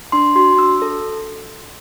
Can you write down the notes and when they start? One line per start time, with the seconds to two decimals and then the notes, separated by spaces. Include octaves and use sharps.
0.12 D4 C6
0.36 F#4 C6
0.58 D4 E6
0.82 A4